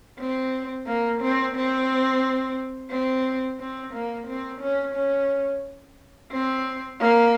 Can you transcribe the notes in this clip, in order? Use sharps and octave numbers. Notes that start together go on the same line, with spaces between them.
C4
A#3
C4
C4
C4
C4
A#3
C4
C#4
C#4
C4
A#3